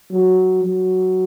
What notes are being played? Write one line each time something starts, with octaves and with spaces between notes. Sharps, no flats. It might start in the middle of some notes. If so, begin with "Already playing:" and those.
F#3
F#3